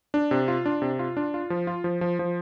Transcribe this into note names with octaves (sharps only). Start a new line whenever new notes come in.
D4
C3
F4
D4
C3
F4
D4
F4
F3
F4
F3
F3
F3